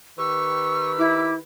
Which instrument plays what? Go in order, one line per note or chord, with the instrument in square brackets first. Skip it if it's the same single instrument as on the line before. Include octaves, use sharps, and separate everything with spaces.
[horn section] D#3 G4 B4 [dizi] C#6 [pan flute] E6
[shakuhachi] E4 [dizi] D6